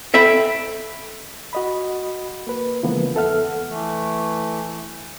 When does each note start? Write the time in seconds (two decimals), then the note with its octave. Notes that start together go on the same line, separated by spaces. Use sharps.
0.14 A4 E5 G5 B5
1.53 F#4 D#5 B5
2.47 A#3 B4
2.83 C#3 E3 F3 G#3 A#3 B3
3.14 E2 B3 A4 E5 F#5 F6
3.68 E3 A3